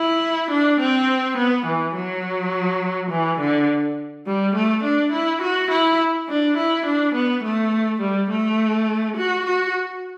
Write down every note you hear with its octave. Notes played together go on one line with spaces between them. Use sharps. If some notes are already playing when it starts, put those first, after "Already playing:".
Already playing: E4
D4
C4
B3
E3
F#3
E3
D3
G3
A3
D4
E4
F#4
E4
D4
E4
D4
B3
A3
G3
A3
F#4
F#4